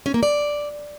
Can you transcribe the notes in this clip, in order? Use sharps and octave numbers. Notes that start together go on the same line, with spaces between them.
C#4
A#3
D5